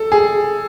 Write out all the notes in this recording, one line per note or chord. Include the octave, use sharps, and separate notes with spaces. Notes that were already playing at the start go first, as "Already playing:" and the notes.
Already playing: A4
G#4